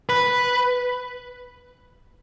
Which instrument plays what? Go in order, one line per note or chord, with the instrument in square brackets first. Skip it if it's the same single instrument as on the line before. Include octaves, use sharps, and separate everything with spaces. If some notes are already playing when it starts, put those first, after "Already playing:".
[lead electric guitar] B4